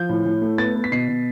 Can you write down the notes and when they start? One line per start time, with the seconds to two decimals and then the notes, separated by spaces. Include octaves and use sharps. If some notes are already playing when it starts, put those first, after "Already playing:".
Already playing: F3 G6
0.09 A2
0.25 A2
0.42 A3
0.58 B3 A6
0.76 B3
0.84 B6
0.92 B2 C7
1.08 B2